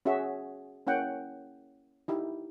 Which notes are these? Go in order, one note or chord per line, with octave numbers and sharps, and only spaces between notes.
C#4 F#4 G#4 E5
A#3 C#4 E4 F#5 G5
D#4 E4 G4